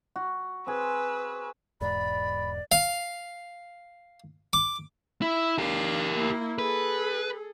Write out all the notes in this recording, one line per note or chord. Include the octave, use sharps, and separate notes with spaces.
F#4
C4 G#4 B4 E6
E1 E2 G#2 D5 B5
F5
D6
E4
D4 G4 A#4 F5
A#3 E4
G#4 A4 B4